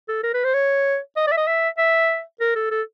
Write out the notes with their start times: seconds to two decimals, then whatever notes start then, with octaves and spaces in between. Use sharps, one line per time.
0.08 A4
0.23 A#4
0.34 B4
0.44 C5
0.54 C#5
1.16 D#5
1.27 D5
1.31 E5
1.37 D#5
1.47 E5
1.78 E5
2.40 A#4
2.55 A4
2.71 A4